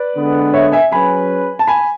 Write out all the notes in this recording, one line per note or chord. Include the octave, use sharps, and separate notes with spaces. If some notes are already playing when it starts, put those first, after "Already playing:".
Already playing: B4 D5
D3 G#3 B3
C#5 E5
E5 G#5
F#3 C#4 G#4 B4 G#5 B5
A5
G#5 B5